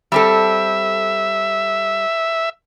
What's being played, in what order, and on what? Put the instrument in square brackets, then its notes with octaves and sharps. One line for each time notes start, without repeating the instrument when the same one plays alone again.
[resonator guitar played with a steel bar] G3 C4 A4 [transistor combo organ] E5